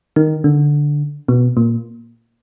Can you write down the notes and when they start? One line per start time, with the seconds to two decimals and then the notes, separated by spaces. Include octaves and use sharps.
0.16 D#3
0.44 D3
1.28 B2
1.57 A#2